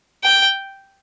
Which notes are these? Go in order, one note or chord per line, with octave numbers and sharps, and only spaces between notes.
G5